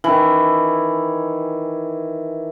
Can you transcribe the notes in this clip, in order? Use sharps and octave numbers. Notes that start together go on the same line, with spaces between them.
D#3 E3